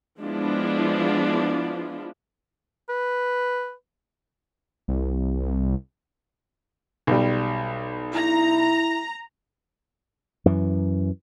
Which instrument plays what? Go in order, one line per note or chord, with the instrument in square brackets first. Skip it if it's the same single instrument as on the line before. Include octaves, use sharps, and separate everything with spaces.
[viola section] F3 G#3 B3 D4 E4 F4
[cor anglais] B4
[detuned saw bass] C2
[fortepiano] B1 G3
[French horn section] E4 [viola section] A#5
[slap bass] F#2 E3